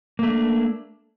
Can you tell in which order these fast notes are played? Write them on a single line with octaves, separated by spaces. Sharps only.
A#3 A3 D4